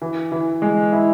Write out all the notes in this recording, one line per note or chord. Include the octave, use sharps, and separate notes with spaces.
E3
E3
G#3
E4